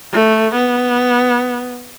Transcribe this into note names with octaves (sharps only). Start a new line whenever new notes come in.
A3
B3